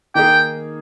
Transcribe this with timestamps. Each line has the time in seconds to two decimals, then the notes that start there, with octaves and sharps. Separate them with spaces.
0.15 D#3 A#3 D#4 G#4 G5